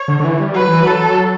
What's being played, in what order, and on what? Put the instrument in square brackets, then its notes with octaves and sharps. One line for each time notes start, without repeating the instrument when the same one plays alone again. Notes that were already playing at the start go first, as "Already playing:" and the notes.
Already playing: [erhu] C#5
[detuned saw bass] D3
D3
E3
G3
[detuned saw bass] F#3 [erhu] B4
[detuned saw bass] E3
[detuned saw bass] F#3 [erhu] A4